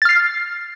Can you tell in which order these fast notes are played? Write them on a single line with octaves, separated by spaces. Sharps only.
A6 F6 C7